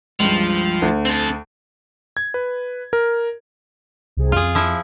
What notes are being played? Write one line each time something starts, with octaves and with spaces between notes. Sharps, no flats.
C#2 G2 F3
D2
C4 A4
G#6
B4
A#4
C2 C3 G#4
F2 F4 G#4
F3 E4